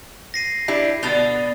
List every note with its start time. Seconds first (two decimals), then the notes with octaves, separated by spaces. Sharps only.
0.34 A#6 C7 D#7
0.68 D4 E4 G4
1.03 B2 D3 B3 A6 F7 G7